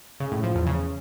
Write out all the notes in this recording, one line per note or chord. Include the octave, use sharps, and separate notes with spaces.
C#3
A2
F3
E2
C#3